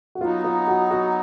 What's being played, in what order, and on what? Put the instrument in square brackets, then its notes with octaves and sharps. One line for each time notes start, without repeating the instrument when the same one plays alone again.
[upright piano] F#4
[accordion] F#3 B3 D#4 [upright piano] F4
[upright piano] F4
F#4
F#4